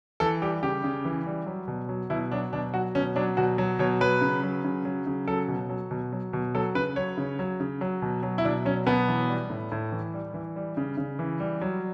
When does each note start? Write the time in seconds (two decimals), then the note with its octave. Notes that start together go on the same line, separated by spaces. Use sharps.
0.20 E3 A4
0.41 G3 G4
0.63 C#3 G4
0.84 C#3
1.05 E3
1.26 G3
1.47 F#3
1.68 B2
1.89 F#3
2.10 B2 E4
2.32 F#3 D4
2.53 B2 D4
2.74 F#3 F#4
2.95 B2 C#4
3.16 F#3 D4
3.37 B2 F#4
3.58 F#3
3.79 B2 C#5
4.01 F#3 B4
4.21 C#3
4.43 F#3
4.64 C#3
4.85 F#3
5.06 C#3
5.28 F#3 A4
5.48 B2
5.69 F#3
5.91 B2
6.13 F#3
6.33 B2
6.55 F#3 A4
6.75 C#3 B4
6.96 F#3 C#5
7.17 C#3
7.39 F#3
7.60 C#3
7.81 F#3
8.02 B2
8.23 F#3
8.38 E4
8.44 B2 D4
8.65 F#3 C#4
8.86 B2 B3
9.08 E3
9.28 G3
9.50 A2
9.72 A2
9.92 E3
10.14 G3
10.34 E3
10.56 G3
10.77 C#3
10.97 C#3
11.19 E3
11.40 G3
11.61 F#3